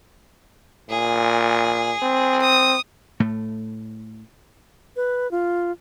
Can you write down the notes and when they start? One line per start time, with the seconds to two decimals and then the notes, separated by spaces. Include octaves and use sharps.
0.90 A#2 G#4
2.03 C4
2.42 D#6
3.20 A2 A3
4.96 B4
5.31 F4